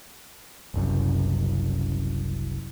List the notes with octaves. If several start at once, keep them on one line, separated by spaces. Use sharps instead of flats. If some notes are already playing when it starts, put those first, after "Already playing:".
F#1 C2 F#2